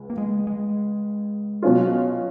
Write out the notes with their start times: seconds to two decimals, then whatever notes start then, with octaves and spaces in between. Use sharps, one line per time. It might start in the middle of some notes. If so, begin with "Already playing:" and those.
Already playing: C#2
0.10 A#3
0.18 G#3
0.47 G#3
1.62 B2 F#3 C#4 F4